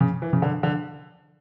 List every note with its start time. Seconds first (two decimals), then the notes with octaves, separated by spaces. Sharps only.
0.01 C#3
0.22 E3
0.33 C#3
0.42 D3
0.63 D3